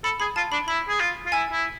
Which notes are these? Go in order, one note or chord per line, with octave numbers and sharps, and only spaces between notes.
A4 B5
G#4 B5
F4 A5
D4 B5
E4 B5
G#4
F4
F4
E4 G#5
E4